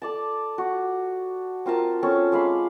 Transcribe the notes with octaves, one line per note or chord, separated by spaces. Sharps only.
A4 D5 A5
F#4
C4 F4 A#4 A5
C4 C#4 A4
G#3 F5 B5 D6